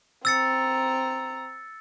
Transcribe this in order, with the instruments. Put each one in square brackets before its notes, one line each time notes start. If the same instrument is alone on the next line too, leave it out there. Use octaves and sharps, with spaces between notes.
[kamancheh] C4 A#5 [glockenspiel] E6 A6 C#7